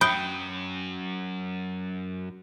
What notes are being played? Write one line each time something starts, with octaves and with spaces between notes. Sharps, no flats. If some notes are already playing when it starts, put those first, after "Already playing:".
F#2 F#3 G5 B5 D#6 F#6